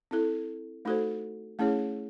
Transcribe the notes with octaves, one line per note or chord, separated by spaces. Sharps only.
C4 E4 A4
A3 D#4 F#4 A4 C5
A3 C#4 E4 G#4 C#5